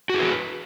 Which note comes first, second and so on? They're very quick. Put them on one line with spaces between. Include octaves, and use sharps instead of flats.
F#4 G#4 B4